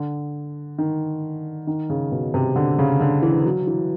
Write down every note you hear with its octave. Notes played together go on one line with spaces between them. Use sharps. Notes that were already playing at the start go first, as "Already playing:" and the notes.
Already playing: D3
D#3
D#3
C#3
B2
C3
D3
C#3
D3
E3
F#3
E3